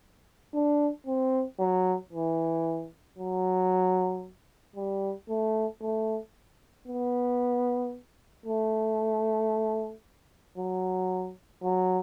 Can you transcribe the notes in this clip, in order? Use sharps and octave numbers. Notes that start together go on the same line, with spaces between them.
D4
C4
F#3
E3
F#3
G3
A3
A3
B3
A3
F#3
F#3